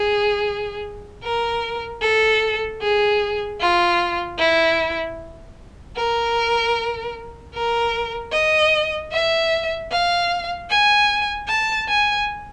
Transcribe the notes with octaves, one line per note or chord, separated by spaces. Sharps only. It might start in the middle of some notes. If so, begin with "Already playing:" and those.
Already playing: G#4
A#4
A4
G#4
F4
E4
A#4
A#4
D#5
E5
F5
G#5
A5
G#5